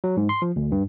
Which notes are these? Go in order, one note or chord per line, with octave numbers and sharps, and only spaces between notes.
F#3
G#2
C6
F3
D2
G2